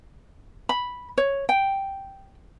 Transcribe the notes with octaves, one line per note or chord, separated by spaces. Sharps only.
B5
C#5
G5